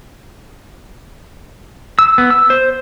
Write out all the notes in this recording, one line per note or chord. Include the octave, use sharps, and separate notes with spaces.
E6
B3
E6
C5